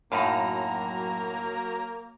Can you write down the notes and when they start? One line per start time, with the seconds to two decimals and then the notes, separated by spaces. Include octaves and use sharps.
0.12 F#2 A2 F#3 A#3 D#4 F5 A#5 B5